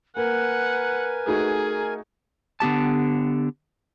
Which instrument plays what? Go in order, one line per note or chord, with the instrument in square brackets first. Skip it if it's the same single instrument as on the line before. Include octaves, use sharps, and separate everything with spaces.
[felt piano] A#3 [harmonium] A#4 G#5 [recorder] B4 [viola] F#5
[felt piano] A3 D#4 F#4 [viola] G#4
[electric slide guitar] D3 B3 G4 A5